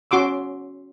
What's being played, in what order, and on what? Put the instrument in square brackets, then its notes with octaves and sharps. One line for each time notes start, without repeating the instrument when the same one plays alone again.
[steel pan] C#4 F#4 C6 D6 E6